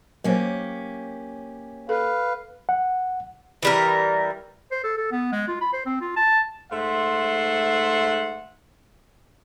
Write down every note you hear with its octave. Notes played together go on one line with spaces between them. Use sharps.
F#3 A#3 C#4 G4 C5
A4 B4 F5
F#5
E3 G3 A#4
C5
A4
A4
B3
G#3
F4
B5
C5
C4
F4
A5
G#2 A3 C5 E5 F#5 C6